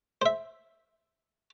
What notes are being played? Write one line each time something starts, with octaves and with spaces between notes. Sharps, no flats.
C5 E5